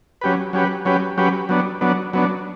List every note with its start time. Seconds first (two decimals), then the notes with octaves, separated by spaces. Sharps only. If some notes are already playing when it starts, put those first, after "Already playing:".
0.21 F#3 C#4 G4 B4
0.53 F#3 C#4 G4 B4
0.85 F#3 C#4 G4 B4
1.17 F#3 C#4 G4 B4
1.49 F#3 B3 D4
1.81 F#3 B3 D4
2.13 F#3 B3 D4